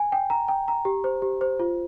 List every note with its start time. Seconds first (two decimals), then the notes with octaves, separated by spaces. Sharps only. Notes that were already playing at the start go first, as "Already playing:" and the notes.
Already playing: G#5
0.12 G5
0.30 A#5
0.48 G5
0.68 A#5
0.85 G4
1.04 C5
1.22 G4
1.41 C5
1.60 F4